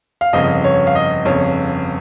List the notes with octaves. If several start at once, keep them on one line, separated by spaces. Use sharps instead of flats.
F5
G1 F2 C#3 F3 D#5
C#5
F5
D#5
G1 F2 C#3 F3 C#5